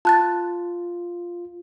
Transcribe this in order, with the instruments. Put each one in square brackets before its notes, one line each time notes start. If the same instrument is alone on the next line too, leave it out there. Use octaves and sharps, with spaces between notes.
[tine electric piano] F4 [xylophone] A5 F#6 A6